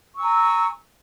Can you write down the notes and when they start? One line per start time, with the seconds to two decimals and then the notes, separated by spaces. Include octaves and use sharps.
0.15 C#6
0.18 E6
0.21 G#5
0.23 A#5